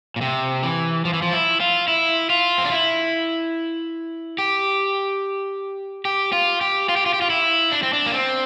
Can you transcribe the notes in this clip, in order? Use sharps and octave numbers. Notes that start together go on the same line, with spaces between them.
A#2
C3
E3
F3
E3
F3
E4
F4
E4
F4
C4
D4
E4
G4
G4
F4
G4
F4
G4
F4
G4
F4
E4
D4
C4
D4
A#3
C4